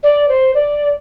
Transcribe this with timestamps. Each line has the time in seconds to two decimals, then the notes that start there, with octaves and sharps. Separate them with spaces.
0.03 D5
0.29 C5
0.54 D5